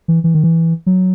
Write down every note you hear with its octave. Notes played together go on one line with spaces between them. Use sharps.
E3
E3
D#3
E3
F#3